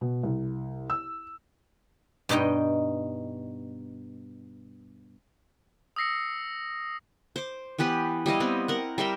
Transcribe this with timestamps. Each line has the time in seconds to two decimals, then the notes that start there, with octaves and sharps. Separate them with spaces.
0.01 B2
0.23 C2
0.90 E6
2.29 G2 B2 D#4 D#5 G5
5.96 D#6 E6 A#6 C7 C#7
7.36 C5 D6
7.78 E3 B3 G4 B4
8.26 G3 E4 D#5 F5
8.40 B3 C4
8.68 A#4 F#5
8.98 G3 A#4 E5 G5